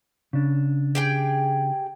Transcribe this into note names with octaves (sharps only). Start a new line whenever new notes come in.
C#3 D4
G4 G#4 G5